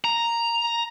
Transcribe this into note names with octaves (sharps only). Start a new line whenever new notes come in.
A#5